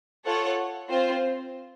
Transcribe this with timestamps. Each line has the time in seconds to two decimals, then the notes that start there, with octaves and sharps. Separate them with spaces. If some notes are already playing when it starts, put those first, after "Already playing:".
0.25 F4 A4 C#5 F#5
0.89 C4 F4 C5